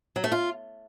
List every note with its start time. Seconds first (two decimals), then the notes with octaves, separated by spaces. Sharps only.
0.16 F#3
0.24 A3
0.32 F4